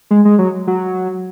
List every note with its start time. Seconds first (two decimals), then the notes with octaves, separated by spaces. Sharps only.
0.11 G#3
0.25 G#3
0.39 F#3
0.67 F#3